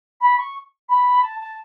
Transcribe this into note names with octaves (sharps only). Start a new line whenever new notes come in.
B5
C#6
B5
A5
A5